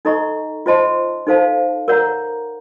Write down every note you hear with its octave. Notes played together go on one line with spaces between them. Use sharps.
D#4 A4 D#5 A#5 C#6
F4 C5 D#5 A5 C6
D#4 A4 C5 F5 A5
A#4 C#5 F#5 A#5